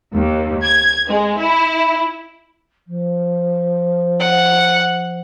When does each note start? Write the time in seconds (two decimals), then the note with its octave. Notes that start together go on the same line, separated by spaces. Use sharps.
0.14 D#2
0.63 G#6
1.10 G#3
1.39 E4
2.87 F3
4.20 F#5